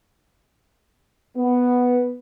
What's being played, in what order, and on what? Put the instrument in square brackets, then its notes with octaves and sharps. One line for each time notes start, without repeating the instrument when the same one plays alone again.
[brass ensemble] B3